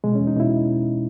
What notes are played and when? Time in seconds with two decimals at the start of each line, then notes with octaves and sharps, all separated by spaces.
0.04 B2 G#3
0.15 C#4
0.20 E2
0.27 D#4
0.36 B2 E4